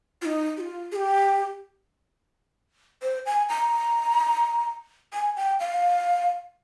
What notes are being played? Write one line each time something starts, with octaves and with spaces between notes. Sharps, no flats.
F4
D#4
G4
F4
G#4
G4
C5
G#5
A#5
G#5
G5
F5